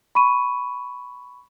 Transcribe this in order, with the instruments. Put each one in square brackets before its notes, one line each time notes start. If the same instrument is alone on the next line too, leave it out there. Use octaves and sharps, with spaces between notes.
[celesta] B5 C#6 D#7